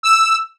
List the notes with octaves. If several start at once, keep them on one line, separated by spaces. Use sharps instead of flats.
E6